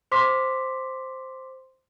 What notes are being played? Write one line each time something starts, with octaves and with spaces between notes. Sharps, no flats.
C5 C6 D6 B6